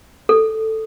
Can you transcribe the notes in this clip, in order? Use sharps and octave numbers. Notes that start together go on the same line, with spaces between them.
A4